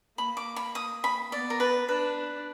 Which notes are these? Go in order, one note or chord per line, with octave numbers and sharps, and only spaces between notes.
A#3 B5
D6
B5
D#6
B5
B3 D5
A#4
B4
D4 B4